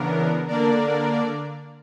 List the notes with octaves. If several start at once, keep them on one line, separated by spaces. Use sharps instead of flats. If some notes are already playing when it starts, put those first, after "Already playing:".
Already playing: C#3 E3 B3 D4 A#4
D3 A#3 D4 A#4 D5